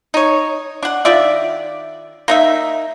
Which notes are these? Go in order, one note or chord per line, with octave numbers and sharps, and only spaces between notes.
D#4 C#5
D4 F#5
D#3 F4 D5 E5
A#3 D#4 E5